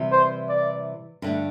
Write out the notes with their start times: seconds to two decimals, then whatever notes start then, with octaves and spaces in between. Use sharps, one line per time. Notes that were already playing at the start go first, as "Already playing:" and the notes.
Already playing: C3 E3 G3
0.12 C5
0.49 D5
1.22 G2 D3 A3